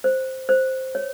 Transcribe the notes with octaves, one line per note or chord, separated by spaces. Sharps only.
C5
C5
C#5